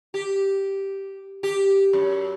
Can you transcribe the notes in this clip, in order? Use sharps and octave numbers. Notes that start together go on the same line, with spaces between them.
G4
G4
F#2